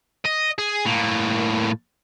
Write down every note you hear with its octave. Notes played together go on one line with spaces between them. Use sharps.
D#5
G#4
A2 A#3